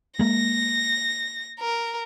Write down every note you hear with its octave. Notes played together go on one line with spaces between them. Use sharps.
G#3 A#3 A#6
A#4